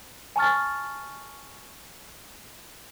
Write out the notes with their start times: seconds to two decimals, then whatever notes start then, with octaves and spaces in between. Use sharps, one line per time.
0.36 G#5 A5 C#6 F6 A6